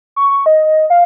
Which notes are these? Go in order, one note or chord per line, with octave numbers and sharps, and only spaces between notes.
C#6
D#5
F5